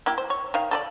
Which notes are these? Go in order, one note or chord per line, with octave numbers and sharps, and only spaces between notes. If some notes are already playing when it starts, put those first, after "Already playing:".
A#3 E4 G4
C5
C#5
D#3 F5
A4 B4 D5